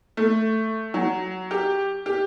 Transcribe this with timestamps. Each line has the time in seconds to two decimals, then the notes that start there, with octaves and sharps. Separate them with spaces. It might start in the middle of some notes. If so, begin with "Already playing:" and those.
0.17 A3
0.94 F#3
1.51 G4
2.06 G4